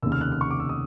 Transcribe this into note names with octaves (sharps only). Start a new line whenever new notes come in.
F1 D#2 C#3 E6
F6
F#6
F6
C#6
D6
E6
D#6